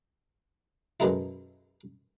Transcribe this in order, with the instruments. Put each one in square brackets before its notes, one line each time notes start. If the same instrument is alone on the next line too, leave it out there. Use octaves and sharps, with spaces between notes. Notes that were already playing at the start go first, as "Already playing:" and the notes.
[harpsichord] F#2 B2 G#3 A3 D#4 E4